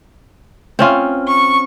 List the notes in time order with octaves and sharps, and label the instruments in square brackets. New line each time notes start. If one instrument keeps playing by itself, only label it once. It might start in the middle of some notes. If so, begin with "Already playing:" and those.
[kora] C4 C#4 F4
[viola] C#6